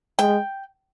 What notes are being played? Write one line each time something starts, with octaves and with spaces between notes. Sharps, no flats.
G#3 G5